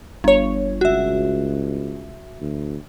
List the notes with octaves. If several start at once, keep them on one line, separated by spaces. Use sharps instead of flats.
G1 C#5
C#2 F#4 E5
D2